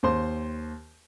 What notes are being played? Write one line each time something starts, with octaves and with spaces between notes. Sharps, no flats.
D#2 C5 C6